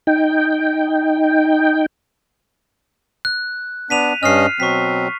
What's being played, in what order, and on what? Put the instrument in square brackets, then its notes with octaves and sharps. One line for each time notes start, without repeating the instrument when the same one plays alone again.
[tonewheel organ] D#4 G5
[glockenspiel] F#6
[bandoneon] B3 D4 [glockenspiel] B6 D#7 F7
[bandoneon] G2 C#4 D#5 [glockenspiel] F6 C7
[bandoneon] B2 F#3 C4 [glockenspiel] C#6 B6